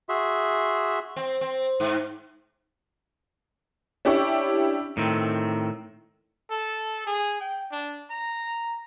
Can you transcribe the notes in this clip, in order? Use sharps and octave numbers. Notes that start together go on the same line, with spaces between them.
F#4 G#4 E5 C6
C4
C4
G#2
C#4 D4 E4 G4 G5 C#6
A2 D#3 C4
A4
G#4
G5
D4
A#5